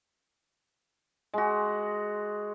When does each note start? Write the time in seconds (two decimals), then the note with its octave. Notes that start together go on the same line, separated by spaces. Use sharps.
1.33 G#3 F#4